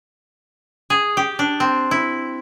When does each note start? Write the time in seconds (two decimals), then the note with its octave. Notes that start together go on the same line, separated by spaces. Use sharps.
0.90 G#4
1.17 G4
1.39 D4
1.60 C4
1.91 E4